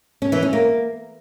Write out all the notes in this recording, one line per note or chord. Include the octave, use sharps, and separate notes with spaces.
C#4
E3
C#4
A#3